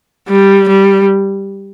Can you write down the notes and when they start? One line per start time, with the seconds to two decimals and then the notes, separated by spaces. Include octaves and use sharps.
0.29 G3
0.68 G3